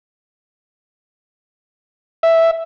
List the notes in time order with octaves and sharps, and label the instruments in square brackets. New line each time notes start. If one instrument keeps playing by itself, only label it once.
[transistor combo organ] E5